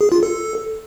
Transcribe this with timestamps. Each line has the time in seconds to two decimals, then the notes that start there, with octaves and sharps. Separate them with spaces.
0.01 G#4
0.12 F4
0.23 A4